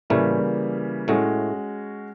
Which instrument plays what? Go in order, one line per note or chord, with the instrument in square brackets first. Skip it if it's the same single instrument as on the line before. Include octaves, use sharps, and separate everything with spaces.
[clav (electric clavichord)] A2 A3 [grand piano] C#3 E3 G3 A#3
[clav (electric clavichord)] A2 A3 [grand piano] G#3 C#4 F#4